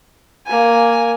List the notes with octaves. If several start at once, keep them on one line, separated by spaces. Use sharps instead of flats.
A#3 G#5